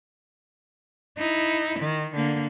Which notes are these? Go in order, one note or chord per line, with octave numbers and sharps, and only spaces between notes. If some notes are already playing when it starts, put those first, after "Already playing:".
D#4 E4
D#3
D3 A#3